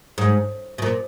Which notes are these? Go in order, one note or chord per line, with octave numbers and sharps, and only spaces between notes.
G#2
B2
A#2